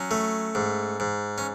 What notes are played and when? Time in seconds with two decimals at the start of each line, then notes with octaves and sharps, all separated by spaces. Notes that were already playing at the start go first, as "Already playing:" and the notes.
Already playing: F#3 C#4
0.11 A3
0.55 G#2
1.00 G#2
1.38 C#4